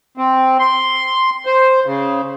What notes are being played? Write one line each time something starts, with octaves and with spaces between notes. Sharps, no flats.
C4
C6
C5
C#3